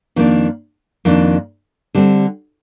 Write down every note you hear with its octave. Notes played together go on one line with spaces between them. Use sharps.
F2 D#3 A#3 D4
F2 D#3 A#3 D4
D3 G3 C4